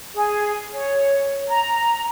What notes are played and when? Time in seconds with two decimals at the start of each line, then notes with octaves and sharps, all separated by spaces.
0.14 G#4
0.73 C#5
1.48 A#5